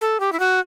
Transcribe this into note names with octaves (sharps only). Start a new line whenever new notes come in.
A4
G4
E4
F#4